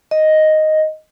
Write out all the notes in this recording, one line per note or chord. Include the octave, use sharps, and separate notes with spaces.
D#5